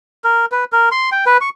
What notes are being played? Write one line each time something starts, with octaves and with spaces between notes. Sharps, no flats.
A#4
B4
A#4
C6
G5
B4
C#6